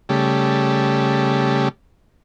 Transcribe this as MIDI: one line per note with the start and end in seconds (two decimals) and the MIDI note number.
0.09 1.69 49
0.09 1.69 55
0.09 1.69 57